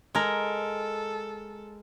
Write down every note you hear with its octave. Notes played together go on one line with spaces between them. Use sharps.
G#3 A4 A#4